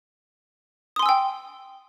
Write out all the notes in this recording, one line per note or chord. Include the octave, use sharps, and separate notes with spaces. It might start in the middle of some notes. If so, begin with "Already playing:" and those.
G5 G#5 C6 D#6 E6